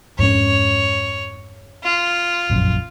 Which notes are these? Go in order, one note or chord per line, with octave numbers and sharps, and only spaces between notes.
F2 G#2 C#4 C#5
F4
F1 A#1 F#2